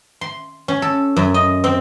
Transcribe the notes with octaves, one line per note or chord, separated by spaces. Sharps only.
C6
C#4
A4
F#2
D#5
C4